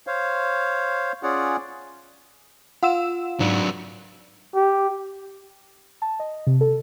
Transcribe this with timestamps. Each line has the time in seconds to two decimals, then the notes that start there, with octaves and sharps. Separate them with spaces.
0.07 C5 C#5 F5
1.23 C#4 F4 G#4 C#5 D5 F#5
2.83 F4 F#5 E6 E7
3.40 G#2 F#3 D4
4.55 G4
6.02 A5
6.20 D#5
6.47 C3
6.61 A4